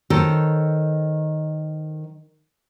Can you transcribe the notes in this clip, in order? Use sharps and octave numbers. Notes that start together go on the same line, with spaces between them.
D#3 A4 C5 C#5